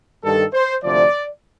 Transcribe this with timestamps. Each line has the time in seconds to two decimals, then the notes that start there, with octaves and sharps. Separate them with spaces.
0.23 G2 D#3 G3 A4
0.53 C5
0.83 D2 C3 F3 D5